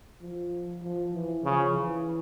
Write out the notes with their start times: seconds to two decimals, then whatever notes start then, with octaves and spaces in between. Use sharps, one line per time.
0.21 F3
0.83 F3
1.13 E3
1.44 C#3 F3
1.74 E3